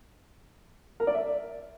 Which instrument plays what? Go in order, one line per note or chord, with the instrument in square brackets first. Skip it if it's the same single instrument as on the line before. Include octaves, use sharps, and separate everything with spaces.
[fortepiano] A#4
D5
E5